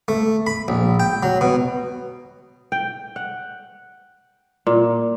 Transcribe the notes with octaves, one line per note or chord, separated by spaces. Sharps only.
A3
B5
A#1
G5
F#3
B2
G5
F#5
A#2